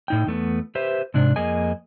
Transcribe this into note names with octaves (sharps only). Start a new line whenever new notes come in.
A2 D#4 G5
E2 A3 B3
G4 B4 C5 E5
G#2 C3 D4
F2 A#3 G#4 D#5 G#5